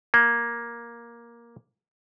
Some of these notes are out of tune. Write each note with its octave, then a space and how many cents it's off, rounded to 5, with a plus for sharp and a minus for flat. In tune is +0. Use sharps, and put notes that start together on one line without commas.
A#3 +10